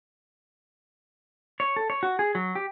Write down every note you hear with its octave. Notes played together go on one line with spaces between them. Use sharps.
C#5
A4
C#5
F#4
G#4
F#3
G4